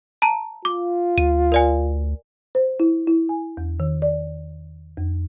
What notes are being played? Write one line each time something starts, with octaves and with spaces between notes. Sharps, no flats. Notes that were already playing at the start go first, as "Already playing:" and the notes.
A5 A#5
F4 D6
D2 D#7
A#4 D5 G#5
C5
E4
E4
G#5
E2
D#3
D5
F2